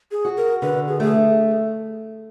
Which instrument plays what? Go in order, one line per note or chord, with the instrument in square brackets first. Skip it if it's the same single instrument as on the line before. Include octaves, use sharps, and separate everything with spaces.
[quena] G#4
[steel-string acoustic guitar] F#4
[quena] A#4
[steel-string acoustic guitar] D3 [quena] B4
[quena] G#4
[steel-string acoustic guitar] A3 [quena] G#4